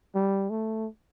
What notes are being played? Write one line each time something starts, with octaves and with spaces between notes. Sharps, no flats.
G3
A3